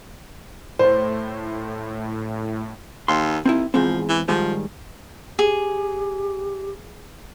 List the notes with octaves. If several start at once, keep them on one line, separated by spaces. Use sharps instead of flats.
A2 C5
D#2 C6
D#2 C4 E4
E2 G#2 F3 C4
E3
G#2 D#3 F3 G3
G4 G#4